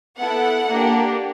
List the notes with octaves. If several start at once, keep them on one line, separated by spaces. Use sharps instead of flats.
B3 E4 A4 F#5
A#3 D4 G4